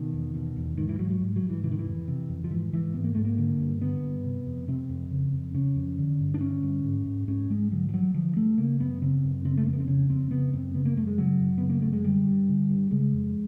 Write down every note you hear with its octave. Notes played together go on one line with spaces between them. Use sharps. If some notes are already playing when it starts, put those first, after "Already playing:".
Already playing: B2 D#3
E2
B2
E2
G#2 D#3
E3
G#2 F#3
F#3
G#2
F#3
G#2
E3
C3 E3
D#3
E3
F2
C3
F2
F3
G#2 E3
G#2 E3
G#2 B3
A#3
G#2 A3
A#3
D3
G2
D3 B3
G2
C3
F2
C3 C4
F2
C#3
F2
C#3 C#4
F2
D3
G2
D4
D3 C#4
G2
G#2
G#2
G#2 C#4
G#2 G#3
D3 F#3
F3
G2 F#3
D3 F3
G2 A3
C#3 A#3
F#2 B3
C#3 C4
F#2
C#3 C4
A3
F2 A#3
B3
C4
C#3 C#4
F2 C4
C#3 B3
F#2 C4
C#3 B3
A#3
F#2 A3
G#3
C#3 F#3
F#2
C#3 B3
A#3
F#2 A3
G#3
D3 G3
G2
D3
G2
C#3 G#3
F2